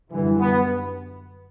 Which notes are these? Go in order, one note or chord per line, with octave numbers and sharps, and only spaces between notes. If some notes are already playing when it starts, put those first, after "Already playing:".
F#2 D3 E3 G3
B3